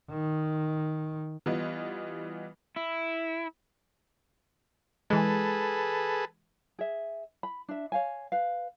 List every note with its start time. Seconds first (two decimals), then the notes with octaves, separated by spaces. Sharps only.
0.10 D#3
1.46 E3 G3 B3 F4 D#5
2.76 E4
5.10 E3 G#3 G#4 A4 B4
6.79 G#4 E5
7.43 B5
7.69 D4 E5
7.92 C#5 F5 G#5
8.32 B4 F5